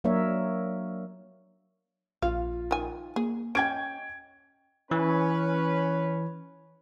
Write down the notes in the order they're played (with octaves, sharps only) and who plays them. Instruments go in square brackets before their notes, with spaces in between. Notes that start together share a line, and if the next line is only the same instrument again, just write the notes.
[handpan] F#3 A#3 D4 A#4 C#5 E5
[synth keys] A#1 [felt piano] F4 [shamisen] F5
[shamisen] D#3 G#5
[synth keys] A#3 [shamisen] G#4
[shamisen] C#4 [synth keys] D#5 G#5 C#6 [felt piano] G5 G#6 D7
[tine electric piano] E3 [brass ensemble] C#4 B4 C#5